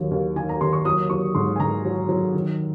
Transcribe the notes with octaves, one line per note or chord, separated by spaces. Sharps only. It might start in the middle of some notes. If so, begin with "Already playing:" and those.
Already playing: D#2 D#3 F#3
D#2
D#3 G#5
A#5
D#2 C6
C#6
F#3 D#6
F#3 C#6
G#2 C6
G#5
G#2 A#5
F#3
F#3
D#3